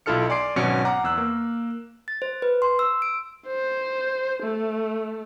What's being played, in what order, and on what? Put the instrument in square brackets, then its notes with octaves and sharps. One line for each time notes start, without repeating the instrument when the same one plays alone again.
[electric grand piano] B1 E4 F4 A4 F6 C#7
D5 G#5 C6 D6 C7 D7
G#1 B2 F#3 C#4 F#4 C#7
F#5 A#5 D6
E2 E6 F#6
A#3
[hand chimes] A6
C5
B4
C6
E6
D7
[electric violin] C5
A3